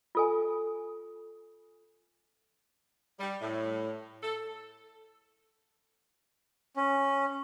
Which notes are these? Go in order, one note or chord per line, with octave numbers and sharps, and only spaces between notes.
F4 A4 G#5
G3
A2
A4
C#4